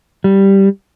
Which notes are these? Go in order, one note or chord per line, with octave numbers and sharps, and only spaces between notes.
G3